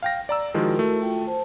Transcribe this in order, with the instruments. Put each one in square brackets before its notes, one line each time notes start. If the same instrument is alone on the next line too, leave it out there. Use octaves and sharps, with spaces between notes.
[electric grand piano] F5 G5 A#6
D5 A#5 E6
[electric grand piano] D#3 F3 G#3 [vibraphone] E4 F#4 A#4
[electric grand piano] A3
[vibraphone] F4 G5 A5
C5 A5